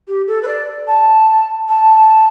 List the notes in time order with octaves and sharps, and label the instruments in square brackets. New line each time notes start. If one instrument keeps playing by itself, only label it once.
[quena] G4
A4
B4
D5
A5
A5